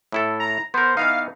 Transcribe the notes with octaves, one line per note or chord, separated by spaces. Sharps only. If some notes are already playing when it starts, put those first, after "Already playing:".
A2 E4 A4
A#5
B3 A#4 C5
E3 B3 D#4 F5